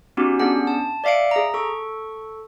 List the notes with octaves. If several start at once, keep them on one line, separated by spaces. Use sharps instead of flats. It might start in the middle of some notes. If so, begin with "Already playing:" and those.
B3 C#4 D#4 F#4 G4
B3 C#4 D4 G#4 F#5
A5
D5 E5 F5 C#7 D7
G#4 A#5
A4 C#6